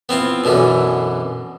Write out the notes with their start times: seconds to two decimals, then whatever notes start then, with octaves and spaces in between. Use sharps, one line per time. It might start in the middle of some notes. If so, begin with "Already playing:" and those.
0.09 B3 C4 E4 F4
0.44 F#2 B2 D3 E3